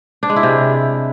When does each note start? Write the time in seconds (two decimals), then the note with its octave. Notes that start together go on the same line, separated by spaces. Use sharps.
0.23 D4
0.29 G#3
0.36 E4
0.43 C3